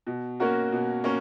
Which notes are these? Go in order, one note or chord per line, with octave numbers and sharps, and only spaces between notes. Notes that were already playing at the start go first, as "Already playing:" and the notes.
B2
A#3 C#4 F#4 A#4
B2
A#3 C#4